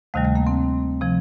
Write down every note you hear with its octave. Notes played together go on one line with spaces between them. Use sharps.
D2 C3 D#3 G3 A3
A3
A#3
C4
C3 F3